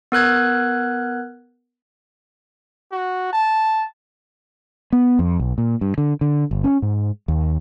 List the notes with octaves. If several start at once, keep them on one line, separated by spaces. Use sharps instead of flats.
B3 A#4 F#6 G#6
F#4
A5
B3
F2
B1
A#2
G2
D3
D3
G1
C#4
G#2
D#2